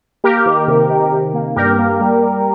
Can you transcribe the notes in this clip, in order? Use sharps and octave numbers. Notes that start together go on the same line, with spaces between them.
A#3 G4 A#4
D#3
C3
D#3
C3
A#3
G2 G4 A#4
A#3
G3
G3